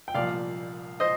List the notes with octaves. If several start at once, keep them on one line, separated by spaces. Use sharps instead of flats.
G5
C2 A#2 F3 D5 F5
C5 D#5